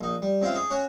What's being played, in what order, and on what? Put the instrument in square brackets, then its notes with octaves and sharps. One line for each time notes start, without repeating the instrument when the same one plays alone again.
[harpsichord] A#1 D#4
G3
C#2 C4 E4 F4 F5
D#4 G#4
C#4 F#4 C#5 F#5 G#5